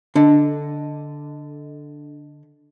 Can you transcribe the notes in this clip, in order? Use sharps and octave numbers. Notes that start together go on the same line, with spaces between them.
D3 D4 A4 D#5